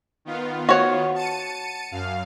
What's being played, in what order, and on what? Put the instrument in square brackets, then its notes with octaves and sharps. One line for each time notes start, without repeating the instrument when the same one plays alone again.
[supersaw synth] D#3 B3 F4
[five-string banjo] F#4 C#5
[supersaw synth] A5 C#7 D#7
F#2 F5